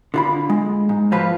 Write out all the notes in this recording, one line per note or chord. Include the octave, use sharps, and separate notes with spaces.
D3 F4 B5
G#3
G#2
F3 F4 B4